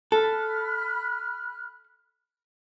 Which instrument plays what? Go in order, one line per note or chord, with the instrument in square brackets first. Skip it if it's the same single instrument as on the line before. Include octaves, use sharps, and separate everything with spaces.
[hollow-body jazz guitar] A4 [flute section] B5 F6 F#6